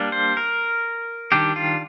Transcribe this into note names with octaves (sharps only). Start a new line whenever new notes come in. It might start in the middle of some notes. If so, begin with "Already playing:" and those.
Already playing: G3 A#3 D4
C5
A#4
D#3 G3 D4 G4
F4